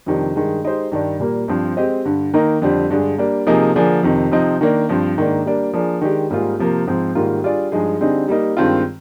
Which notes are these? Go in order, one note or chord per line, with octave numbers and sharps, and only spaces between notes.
F2 C3 D#3 G3 D4
G2 D#3 G#3
G#3 D#4 G4 C5
G2 D#3 G3 D4
A#2 G3 A#3
G2 F3 C4
G#3 C4 G4 C5 D#5
G2 D3 G3
D#3 A#3 D#4 A#4
F2 D3 G3 C4
G2 D3 G#3 D4 G#4
G3 A#3 D4
C3 F3 A#3 D#4 G#4
D3 F3 A#3 D4 G#4
F2 C3 D#3
C3 F3 C4 D#4
D#3 A#3 D4
G2 F3 C4
G#2 D#3 A#3 D4
G3 A#3 D4
F3 A#3 D4 G#4
D#3 G#3 D4 G4
G#2 G3 A#3 F4 G#4
C3 F3 A#3
G#2 F3 C4
G#2 D#3 G3 A#3 F4
G3 D4 F4 G#4 D5
G2 F3 G#3 D#4 G#4
D3 G3 C4 D#4 G#4
G3 A#3 D#4
G2 D#3 G#3 C4 F4